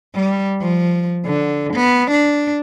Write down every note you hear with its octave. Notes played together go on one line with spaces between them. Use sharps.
G3
F3
D3
B3
D4